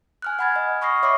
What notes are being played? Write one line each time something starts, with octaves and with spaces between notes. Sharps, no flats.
G#5 F6 F#6
F#5 G#5 B5 F6 G#6 A6
D#5
B5 C#6 D#6 F6 A#6 C7
C#5 E5 B5 C#6 D6 C7